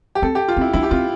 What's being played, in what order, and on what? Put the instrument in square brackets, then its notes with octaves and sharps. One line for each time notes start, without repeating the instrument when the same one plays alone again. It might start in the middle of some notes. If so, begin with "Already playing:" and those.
[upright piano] G4
[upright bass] C4 [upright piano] A4
[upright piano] G4
F4
[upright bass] C4 [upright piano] E4
[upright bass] D4 [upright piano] E4
[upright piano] G4
[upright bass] C4 [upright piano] F4